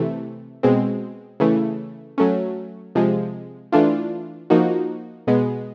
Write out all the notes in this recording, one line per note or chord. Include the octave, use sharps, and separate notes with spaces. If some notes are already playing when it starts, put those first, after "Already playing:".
Already playing: C3 E3 A3
B2 G#3 C4
C#3 E3 A3
F#3 A3 C#4
C3 F3 G#3
E3 A3 D4 F4
F3 A#3 D#4 F#4
B2 G#3 B3